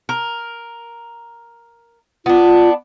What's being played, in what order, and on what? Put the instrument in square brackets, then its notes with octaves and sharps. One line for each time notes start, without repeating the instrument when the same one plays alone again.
[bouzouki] A#4
[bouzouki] B3 D4 [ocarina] F4